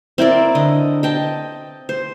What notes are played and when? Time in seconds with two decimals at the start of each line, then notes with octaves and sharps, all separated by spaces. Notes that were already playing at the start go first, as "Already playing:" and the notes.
0.18 C4 E4 A#4 D5
0.55 D3 D#5
1.03 D#5 G5 A5
1.89 C5